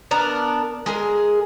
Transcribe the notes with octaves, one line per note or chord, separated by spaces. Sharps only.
B3 D4 A#4
G#3 G#4 A#4